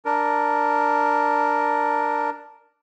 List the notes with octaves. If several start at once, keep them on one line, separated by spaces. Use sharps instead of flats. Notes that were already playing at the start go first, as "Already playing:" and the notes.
D4 A#4